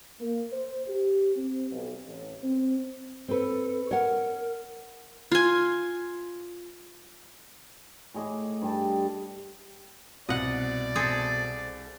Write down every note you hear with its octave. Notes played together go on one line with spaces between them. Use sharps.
A#3
C5
G4
C4
B1
A1
C4
C4 A4 B4
A#4 C#5 F#5
F4 G#5
A2 G#4 D#5 D6
G2 G3 A5
C2 B2 D5 D#5 F#5
C4 G#4 A4